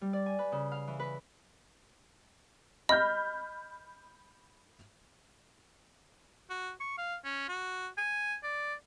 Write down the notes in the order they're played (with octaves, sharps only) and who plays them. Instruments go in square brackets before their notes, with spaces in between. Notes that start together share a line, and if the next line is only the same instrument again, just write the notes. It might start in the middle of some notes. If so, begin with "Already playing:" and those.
[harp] G3
D5
G#5
B4
C#3
F5
E3
B4
[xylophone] D#5 [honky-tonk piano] B5 F6 G6
[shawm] F#4
C#6
F5
C#4
F#4
G#5
D5